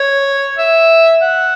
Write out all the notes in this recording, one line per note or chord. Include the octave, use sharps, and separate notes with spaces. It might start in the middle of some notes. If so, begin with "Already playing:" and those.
Already playing: C#5
E5
F#5